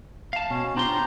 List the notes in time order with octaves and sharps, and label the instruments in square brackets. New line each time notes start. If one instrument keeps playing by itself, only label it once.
[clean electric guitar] F5 A5
[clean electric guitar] B2 [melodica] C#4
[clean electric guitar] D4 F4 C6 [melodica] G4 C5 A#5